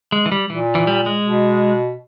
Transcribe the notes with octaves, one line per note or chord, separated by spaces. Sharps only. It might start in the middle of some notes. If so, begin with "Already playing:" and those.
G#3
E3
G3
A#2 E3
E3
G3
G#3
B2